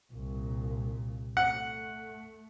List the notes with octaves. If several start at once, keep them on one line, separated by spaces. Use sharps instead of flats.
C2 A#2
A3 F#5